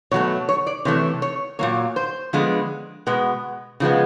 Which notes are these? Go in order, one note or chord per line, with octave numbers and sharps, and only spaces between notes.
B2 F#3 A3 C#5
C#5
D5
C3 E3 A3 C#5
C#5
A#2 F#3 A#3 C#5
C5
D3 F3 G#3 B3
B2 G#3 B3
C#3 F3 G#3 B3